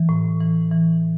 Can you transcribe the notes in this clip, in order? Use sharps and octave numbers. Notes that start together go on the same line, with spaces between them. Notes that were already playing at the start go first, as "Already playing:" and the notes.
Already playing: E3
A2
E3
E3